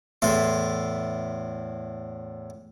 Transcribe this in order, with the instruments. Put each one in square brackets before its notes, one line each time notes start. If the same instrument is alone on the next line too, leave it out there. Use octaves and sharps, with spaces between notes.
[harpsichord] E2 A2 A4 E5 C6